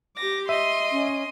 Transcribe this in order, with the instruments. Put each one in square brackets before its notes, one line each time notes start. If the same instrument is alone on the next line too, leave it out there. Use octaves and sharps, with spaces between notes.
[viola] G4 D6 [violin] A#6
[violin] D#5 D#7 [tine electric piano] E5 [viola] C6
[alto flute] C#4